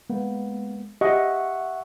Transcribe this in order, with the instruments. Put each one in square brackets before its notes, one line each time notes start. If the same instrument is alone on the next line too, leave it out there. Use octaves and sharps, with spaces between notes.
[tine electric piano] G#3 A#3 B3
[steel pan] G4 D#5 [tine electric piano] E5 F#5 C#6